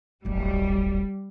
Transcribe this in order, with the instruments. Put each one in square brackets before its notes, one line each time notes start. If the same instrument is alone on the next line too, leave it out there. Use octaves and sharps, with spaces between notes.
[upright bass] D1 G1 [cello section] G3